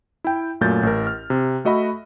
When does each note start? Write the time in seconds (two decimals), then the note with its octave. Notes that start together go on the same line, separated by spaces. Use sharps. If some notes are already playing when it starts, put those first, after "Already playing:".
0.24 E4 G5
0.61 F#2 A#2 A3 A#4 G6 A6
0.83 A1 A#4
1.07 F6
1.30 C3
1.65 A3 F#4 D#5 E5 B5